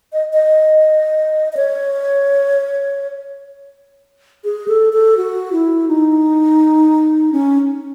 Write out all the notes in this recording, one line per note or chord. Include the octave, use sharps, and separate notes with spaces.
D#5
D#5
D#5
C#5
G#4
A4
A4
F#4
E4
D#4
C#4